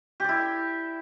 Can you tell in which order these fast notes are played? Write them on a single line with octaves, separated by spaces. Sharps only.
G4 D5 E4